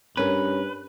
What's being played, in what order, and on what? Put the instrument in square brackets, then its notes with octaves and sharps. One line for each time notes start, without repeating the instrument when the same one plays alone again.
[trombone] G2 [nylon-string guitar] C#4 A#4 [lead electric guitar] B4